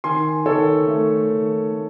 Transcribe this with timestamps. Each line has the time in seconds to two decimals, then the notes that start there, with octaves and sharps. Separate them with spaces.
0.04 D#3 G#5 C6
0.46 D#3 A4 C#5
0.88 A3
1.29 D#3
1.71 A3